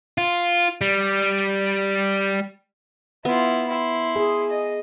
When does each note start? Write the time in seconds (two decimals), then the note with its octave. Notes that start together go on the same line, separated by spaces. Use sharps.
0.18 F4
0.81 G3
3.25 B3 E4 F4
3.69 E4 C6
4.16 G#4
4.50 D#5